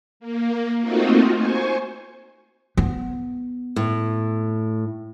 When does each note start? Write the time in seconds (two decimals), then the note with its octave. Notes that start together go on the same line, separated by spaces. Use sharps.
0.20 A#3
0.82 A3 A#3 C4 D#4 F4 F#4
1.32 C5 G#5 C#6
2.77 B3
3.76 A2